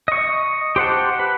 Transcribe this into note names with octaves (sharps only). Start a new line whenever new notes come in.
D#5 C#6
G4 C5 F#5 A5
B4